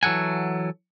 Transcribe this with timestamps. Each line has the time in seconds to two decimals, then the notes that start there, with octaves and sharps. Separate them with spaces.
0.03 E3 F#3 A4 F#5 G#5